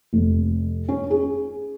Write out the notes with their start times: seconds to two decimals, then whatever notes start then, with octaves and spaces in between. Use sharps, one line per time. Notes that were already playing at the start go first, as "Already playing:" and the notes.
0.13 F1
0.88 C#4
1.10 G#4